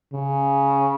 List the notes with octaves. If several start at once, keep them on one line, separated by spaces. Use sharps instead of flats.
C#3